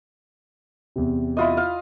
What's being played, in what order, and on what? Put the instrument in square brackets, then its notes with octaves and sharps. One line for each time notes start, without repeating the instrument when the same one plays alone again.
[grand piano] E2 C3
[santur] E4 F4 D#5
F5